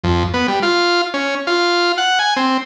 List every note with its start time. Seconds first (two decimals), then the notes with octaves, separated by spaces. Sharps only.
0.04 F2
0.34 B3
0.48 G3
0.63 F4
1.14 C#4
1.47 F4
1.98 F#5
2.19 G#5
2.37 C4